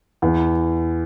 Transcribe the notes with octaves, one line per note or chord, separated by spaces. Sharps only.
E2